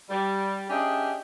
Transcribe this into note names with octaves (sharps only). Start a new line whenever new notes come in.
G3
C#4 D4 G4 G#4 D#5 E5